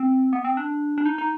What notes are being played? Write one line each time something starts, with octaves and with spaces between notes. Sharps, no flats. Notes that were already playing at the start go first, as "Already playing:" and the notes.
Already playing: C4
B3
C4
D4
D4
D#4
D#4